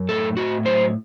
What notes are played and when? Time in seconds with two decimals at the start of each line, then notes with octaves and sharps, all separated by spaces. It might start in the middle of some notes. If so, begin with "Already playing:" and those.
Already playing: F#2
0.09 A2 A4
0.37 A2 F#4
0.65 F#3 C5